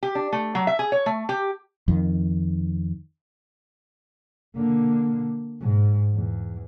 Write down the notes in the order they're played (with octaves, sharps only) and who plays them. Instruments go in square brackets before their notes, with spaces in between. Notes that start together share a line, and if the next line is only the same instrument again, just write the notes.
[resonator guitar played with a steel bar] G4
D4
A3
F#3
E5
G#4
C#5
A3
G4
[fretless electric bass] F2 D#3
[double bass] D3 A#3
G#2
E2